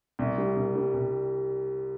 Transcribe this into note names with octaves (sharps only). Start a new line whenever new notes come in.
C2
G3
C2
G3
C2